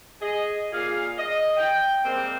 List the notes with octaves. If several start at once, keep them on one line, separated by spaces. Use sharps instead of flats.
G#4 D#5
A#2 G#4 F5
D#5
G5
G3 G#3 A#3 C4